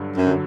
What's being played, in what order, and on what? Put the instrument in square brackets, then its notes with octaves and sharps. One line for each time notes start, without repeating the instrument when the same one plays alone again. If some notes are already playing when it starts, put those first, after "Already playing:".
Already playing: [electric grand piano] G2 D3 F#3
[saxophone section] F#2
[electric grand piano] D3 F#3